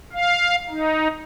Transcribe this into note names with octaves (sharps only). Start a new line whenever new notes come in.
F5
D#4